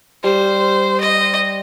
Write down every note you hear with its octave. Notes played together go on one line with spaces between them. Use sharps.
G3 C5
D#5